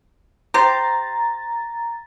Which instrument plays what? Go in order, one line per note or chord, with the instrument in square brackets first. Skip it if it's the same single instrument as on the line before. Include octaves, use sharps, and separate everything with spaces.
[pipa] G4 C5 [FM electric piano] A#5 A6